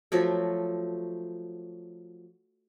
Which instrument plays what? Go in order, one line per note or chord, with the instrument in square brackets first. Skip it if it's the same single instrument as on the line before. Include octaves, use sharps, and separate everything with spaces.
[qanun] F3 F#3 A3